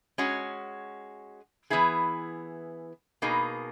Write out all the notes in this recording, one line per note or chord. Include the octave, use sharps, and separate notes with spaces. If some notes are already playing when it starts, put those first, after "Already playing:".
G#3 C#4 F#4
E3 B3 E4 G#4
B2 A#3 D#4 G#4